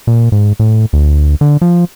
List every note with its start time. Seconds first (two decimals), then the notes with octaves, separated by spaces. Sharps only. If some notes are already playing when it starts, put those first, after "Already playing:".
0.07 A#2
0.32 G#2
0.60 A2
0.93 D2
1.41 D3
1.62 F3